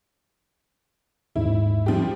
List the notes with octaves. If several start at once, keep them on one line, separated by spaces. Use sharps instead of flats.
D#2 G#2 E4
F3 G3 G4